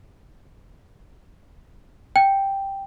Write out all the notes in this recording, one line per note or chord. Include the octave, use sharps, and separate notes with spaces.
G5